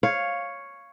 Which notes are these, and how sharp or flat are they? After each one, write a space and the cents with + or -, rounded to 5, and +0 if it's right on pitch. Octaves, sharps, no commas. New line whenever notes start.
C#5 +0 F5 +0